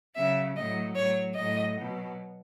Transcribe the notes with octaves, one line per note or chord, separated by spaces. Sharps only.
C#3 F#3 E5
A2 F#3 D#5
A2 F#3 C#5
A2 F#3 D#5
B2 F#3